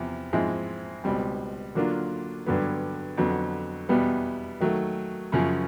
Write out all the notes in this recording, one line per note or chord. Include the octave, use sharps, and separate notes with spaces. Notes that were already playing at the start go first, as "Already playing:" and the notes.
Already playing: E2 C3 F3
G#2 F3 G#3 C4 E4
C#2 B2 G3 C4
D3 F#3 A#3 D4 F4
G2 D3 F#3 B3
F2 D3 F#3 B3
E2 B2 G3 B3
D#3 F#3 A3
F#2 C#3 F3